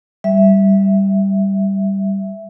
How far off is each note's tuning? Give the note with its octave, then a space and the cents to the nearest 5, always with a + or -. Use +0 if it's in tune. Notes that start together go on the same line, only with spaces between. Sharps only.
G3 +0 E5 +0